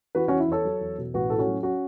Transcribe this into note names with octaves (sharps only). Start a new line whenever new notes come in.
E3 F#4 B4
C#4 F#4
E3
E4
E2 A4 C#5
F#3
E2
B2
A1 F#4 B4
A2 A4
C#4 F#4
F#3
C#4 F#4